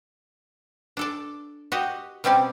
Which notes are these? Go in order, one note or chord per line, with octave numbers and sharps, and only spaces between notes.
D4 A4 D5
F#4 G4 D#5
B2 G3 C4 C#4 D5